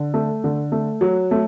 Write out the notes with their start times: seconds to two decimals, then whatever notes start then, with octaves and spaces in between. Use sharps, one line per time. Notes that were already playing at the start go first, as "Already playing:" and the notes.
Already playing: D3
0.14 A3
0.44 D3
0.72 A3
1.01 F#3
1.31 A3